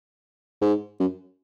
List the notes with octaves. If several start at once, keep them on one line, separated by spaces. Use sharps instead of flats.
G#2
F#2